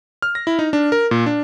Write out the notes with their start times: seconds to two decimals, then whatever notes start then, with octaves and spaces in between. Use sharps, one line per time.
0.22 F6
0.35 A#6
0.47 E4
0.59 D#4
0.73 D4
0.92 A#4
1.11 A#2
1.26 D4